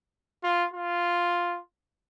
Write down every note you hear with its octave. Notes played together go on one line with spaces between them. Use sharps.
F4
F4